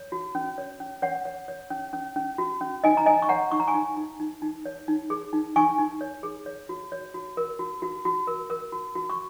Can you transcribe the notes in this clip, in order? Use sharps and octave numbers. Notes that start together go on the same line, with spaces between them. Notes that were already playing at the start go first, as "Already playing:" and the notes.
Already playing: C#5
F#4
C#4
C#5
C#4
C#4 C#5 F#5
C#5
C#5
C#4
C#4
C#4
F#4
C#4
D#4 D#5 G#5
A#5
D#4 D#5 G#5
C#6
C#5 F#5 A#5
D#4 C#6
A#5
G#5 C#6
D#4
D#4
D#4
D#4
C#5
D#4
G#4
D#4
D#4 G#5 C#6
D#4
C#5
G#4
C#5
F#4
C#5
F#4
A#4
F#4
F#4
F#4
A#4
A#4
F#4
F#4
C#6